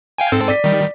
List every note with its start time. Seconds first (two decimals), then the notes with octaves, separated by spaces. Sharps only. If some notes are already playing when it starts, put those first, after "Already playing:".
0.18 F5 G5 G#5
0.32 G#2 C4 A4
0.48 D5 B6
0.64 D#3 G3